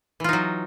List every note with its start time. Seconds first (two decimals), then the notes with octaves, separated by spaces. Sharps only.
0.20 E3
0.24 F4
0.29 D#4
0.33 F#3